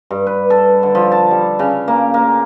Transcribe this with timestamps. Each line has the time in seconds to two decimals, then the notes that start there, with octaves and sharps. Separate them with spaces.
0.11 G2
0.27 B4
0.50 A4
0.83 D3
0.95 F3
1.12 A5
1.31 G3
1.59 C#3
1.88 A#3
2.14 A#3